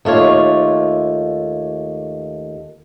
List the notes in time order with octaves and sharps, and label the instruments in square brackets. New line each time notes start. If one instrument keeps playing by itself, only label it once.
[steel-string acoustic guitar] D#2 A3 F4 C#5